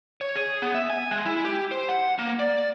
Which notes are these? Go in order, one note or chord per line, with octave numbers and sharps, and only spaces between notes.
C#5
G#4
B3
E5
G#5
G#3
E4
G4
C5
F#5
A#3
D5